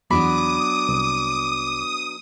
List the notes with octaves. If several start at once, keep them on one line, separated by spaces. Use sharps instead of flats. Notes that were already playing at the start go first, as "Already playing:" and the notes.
E2 F#3 B3 D4 B5 D6 D#6
C2